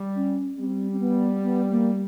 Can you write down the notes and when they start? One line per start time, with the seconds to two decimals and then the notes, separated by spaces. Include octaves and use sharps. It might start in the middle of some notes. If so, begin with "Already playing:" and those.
Already playing: G3
0.16 C#4
0.58 G3 C4
0.93 C4
1.00 B3
1.43 B3
1.70 A#3